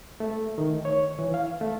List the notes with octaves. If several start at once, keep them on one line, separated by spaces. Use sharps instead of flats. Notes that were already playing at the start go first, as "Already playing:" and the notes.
A3
D#3
C#5
E3
F5
A3